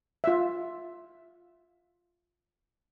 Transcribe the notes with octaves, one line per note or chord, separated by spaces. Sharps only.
F4 E5